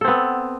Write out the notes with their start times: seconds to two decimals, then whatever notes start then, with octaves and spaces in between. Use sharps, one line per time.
0.01 A4
0.04 C4
0.08 B3